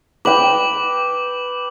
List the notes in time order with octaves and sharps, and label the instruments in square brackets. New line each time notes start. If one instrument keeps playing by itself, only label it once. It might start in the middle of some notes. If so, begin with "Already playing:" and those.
[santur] B4 G5 [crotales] D6 F#7